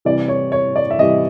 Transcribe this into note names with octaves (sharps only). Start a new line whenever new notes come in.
C3 E3 G3 D5
C#5
C#5
D5
E5
C3 E3 G3 D#5